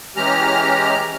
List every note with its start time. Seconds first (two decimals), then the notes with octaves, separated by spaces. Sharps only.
0.16 E3 G#3 C#4 G4 A#5 F6